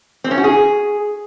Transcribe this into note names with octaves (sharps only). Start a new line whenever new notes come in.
C4
C#4
F#4
G#4